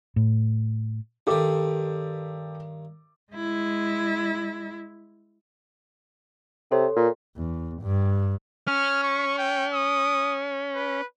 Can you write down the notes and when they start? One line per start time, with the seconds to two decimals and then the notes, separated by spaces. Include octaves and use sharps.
0.16 A2
1.27 G2 D#3 G4 A4 D6
3.33 G#3 E4
6.71 C3 A4 C#5 C6
6.96 A#2
7.37 E2
7.82 G2
8.68 C#4 F6
9.04 C#6
9.38 G5
9.74 D#6
10.75 B4